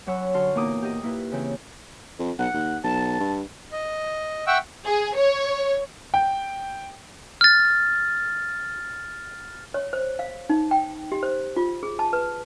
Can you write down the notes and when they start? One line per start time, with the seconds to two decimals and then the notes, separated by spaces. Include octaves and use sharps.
0.06 F#2 F#3 C#5 F#5 B5 E6
0.34 D3 F#4 A5 C6 C#6 F6
0.55 E2 A#2 A#3 D#4 D6 D#6
0.82 G4 D#5
1.03 A#3 E4 F4 B4
1.32 C#3 E3 C4
2.19 F2
2.39 B1 F#5
2.53 D#2
2.84 B1 A5
3.20 G2
3.72 D#5
4.47 E5 F#5 G5 C#6 E6
4.86 G#4
5.15 C#5
6.14 G5
7.41 F6 A6
9.74 C#5
9.93 C5
10.19 F5
10.49 D#4
10.71 G5
11.12 G4
11.23 C5
11.57 F4
11.83 G#4
11.99 A5
12.13 B4